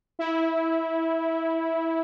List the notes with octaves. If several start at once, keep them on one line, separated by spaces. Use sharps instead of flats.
E4